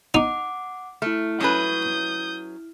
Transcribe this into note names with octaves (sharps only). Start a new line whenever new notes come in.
D#4 F#5 D6
A3 E4 F6
F#3 C#4 B4 D#6 G6